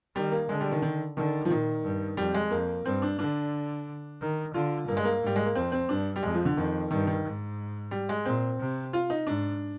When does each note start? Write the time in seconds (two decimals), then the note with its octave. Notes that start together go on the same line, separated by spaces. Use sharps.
0.15 D#3 G3
0.32 A#3
0.49 D3 G#3
0.61 G3
0.71 D#3
0.82 D#3
1.17 D3 D#3
1.45 F3
1.50 A#2 D#3
1.83 G2
2.17 F2 G3
2.34 G#3
2.51 F2 A#3
2.85 G2 C4
3.02 D4
3.19 D3 D4
4.21 D#3
4.54 D3 F4
4.87 G2 A#3
4.97 G#3
5.05 A#3
5.21 G#2
5.26 G3
5.36 G#3
5.46 A#3
5.55 F2 C4
5.72 C4
5.89 G2 D4
6.16 G3
6.23 F2 G#3
6.34 F3
6.45 D3
6.57 F2 D#3
6.90 G2 D#3
7.07 D#3
7.24 G#2
7.91 G3
8.09 G#3
8.25 A#2 C4
8.59 C3
8.93 F4
9.10 D#4
9.27 G#2 D4